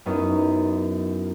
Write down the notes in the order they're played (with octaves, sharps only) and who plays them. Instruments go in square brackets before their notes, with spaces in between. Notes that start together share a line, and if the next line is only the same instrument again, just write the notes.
[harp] F#2 B3 C#4 D#4 E4